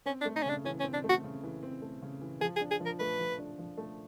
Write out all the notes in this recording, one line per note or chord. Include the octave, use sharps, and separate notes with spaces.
C4 C#4
D4
A3
D#4
C#4
C#3 D4
E3 C#4
C#4
C4
D4
A3
F#4
C#3
E3
C4
A3
C#3
E3
F3 G#4
G#4
D4
G#4
F3
A#4
A3 B4
F3
D4
F3
A3